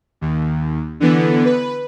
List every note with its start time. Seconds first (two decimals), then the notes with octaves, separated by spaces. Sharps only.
0.21 D#2
1.00 D3 E3 B3
1.45 B4